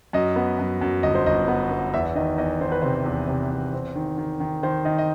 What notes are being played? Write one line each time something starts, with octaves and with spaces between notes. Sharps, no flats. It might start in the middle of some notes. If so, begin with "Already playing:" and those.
F#2 D#5
B3
F#2
F#2
G1 D#5
C5
G1 D#5
B3
B3
E2 E5
E5
D#3 D#5
E2 D#5
D#3 C5
B4
C3 C5
E2
C3
E2
C4
D#3
D#3
D#3
D#3 C5
D#3 D#5
D#5